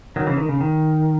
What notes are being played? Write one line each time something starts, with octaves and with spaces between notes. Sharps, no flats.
D#3 F#3
C#3 E3
D#3
C#3
D#3